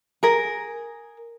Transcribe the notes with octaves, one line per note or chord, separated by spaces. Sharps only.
G#4 A#4